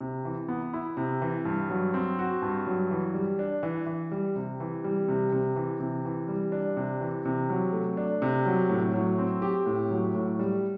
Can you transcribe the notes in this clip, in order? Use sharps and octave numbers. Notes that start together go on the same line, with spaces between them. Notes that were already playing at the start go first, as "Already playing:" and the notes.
C3
E3
B3
E4
C3
E3
G2
F#3
C4
F#4
G2
F#3
E3
G3
D4
E3
E3
G3
C3
E3
G3
C3
C3
E3
C3
E3
G3
D4
C3
E3
C3
F#3
A3
D4
C3
F#3
A2
F#3
C4
G4
A2
F#3
A2
G3